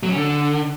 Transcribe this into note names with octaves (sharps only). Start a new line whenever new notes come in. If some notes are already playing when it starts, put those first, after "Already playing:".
F#3
C#4
D3